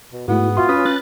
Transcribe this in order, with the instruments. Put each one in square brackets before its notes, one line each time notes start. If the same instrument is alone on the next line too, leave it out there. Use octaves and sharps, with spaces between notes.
[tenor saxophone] B2
[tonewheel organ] G#2 [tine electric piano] A3 E4 F#4 [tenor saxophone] B3
[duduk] F4 [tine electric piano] F#4 E5 C6
[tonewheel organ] C#4 [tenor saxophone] B4 [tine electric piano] D#6
[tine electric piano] C#4 [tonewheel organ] F#6 A6